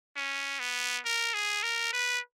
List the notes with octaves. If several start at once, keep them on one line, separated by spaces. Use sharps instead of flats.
C#4
B3
A#4
G#4
A#4
B4